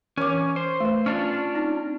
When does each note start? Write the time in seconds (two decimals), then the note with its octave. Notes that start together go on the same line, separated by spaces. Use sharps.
0.18 E3 C#4 C#5 D6
0.56 C5
0.80 A3 B4
1.06 C#4 D4 F4
1.55 C4 D#4